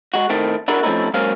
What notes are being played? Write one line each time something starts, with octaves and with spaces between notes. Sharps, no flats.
G#3 F#4
A2 D#3 A3 C4
D4 E4 F#4 G#4 A#4
F3 A3 C4 C#4 D#4 E4
F#3 G#3 A#3 C#4 C5 F5